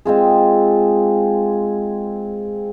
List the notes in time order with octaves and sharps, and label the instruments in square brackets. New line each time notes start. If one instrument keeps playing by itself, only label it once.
[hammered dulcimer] G#3 C4 F4 G#4